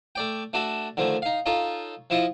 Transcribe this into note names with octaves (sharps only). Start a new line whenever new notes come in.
A3 D5 G5
A3 D4 F#4 A4
D3 D#3 F3 A3
D#4 F5
D#4 F4 A4 C#5
F3 E4 F4 D#5